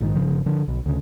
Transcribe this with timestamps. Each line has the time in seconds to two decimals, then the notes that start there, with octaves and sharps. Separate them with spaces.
0.01 A#1 G#2 D#3
0.15 G1 C#3 F3
0.46 D3 F3
0.68 B1 B2
0.86 D2 C#3